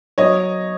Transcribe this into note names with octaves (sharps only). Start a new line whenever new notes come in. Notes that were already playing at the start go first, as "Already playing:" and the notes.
F#3 C#5 D#5